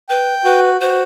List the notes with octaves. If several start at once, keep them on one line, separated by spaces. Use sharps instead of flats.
B4 G5
F#4 B4
F#4 C5